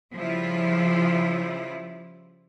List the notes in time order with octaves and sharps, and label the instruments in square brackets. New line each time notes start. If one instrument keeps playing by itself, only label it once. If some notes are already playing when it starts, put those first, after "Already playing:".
[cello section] C#3 F3 G3 E4 F4